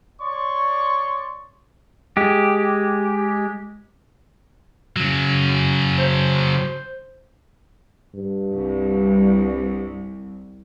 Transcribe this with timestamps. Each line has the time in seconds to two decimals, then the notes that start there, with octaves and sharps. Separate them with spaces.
0.21 C#5 D5 C6 C#6
2.17 G#3 G4
4.97 C#3 F#3
5.99 C5
8.14 G2
8.52 C2